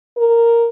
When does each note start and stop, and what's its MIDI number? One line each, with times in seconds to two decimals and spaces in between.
0.17 0.69 70